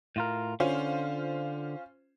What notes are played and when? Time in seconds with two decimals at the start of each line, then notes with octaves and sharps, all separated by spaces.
0.16 A2 F4 A#4
0.60 D3 C#4 F4 C5